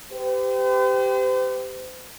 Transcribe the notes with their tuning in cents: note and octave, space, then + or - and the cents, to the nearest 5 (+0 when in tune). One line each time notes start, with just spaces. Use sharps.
G4 +0 C5 -45